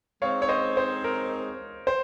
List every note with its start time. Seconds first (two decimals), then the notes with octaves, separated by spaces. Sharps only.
0.22 G#3 C4 D#4 C#5 F5
0.42 C#5
0.49 C5 D#5
0.77 C5
1.04 A#4
1.87 C5